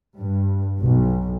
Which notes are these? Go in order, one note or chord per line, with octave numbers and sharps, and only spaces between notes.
G2
B1